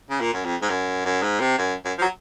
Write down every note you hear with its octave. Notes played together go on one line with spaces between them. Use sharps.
C#3
A#2
F#2
F2
G#2
F#2
F#2
G#2
C3
F#2
F#2
F3
F#3